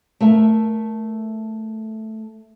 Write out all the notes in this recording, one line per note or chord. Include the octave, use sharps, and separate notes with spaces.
A3 A#4 E5